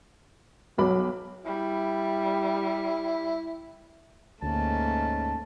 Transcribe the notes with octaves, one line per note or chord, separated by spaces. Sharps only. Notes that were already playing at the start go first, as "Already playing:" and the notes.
B1 F#3 B5 D6
G3 E4
D2 G#2 A3 A#3 C#4 A5